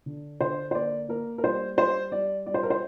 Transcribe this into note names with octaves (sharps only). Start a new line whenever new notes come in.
D3
D3 C5
C5
A#3 D5
A#3 A#4
A#4
G3 C5
G3 C5
G3 D5
G3 D5
C5
A#4
C5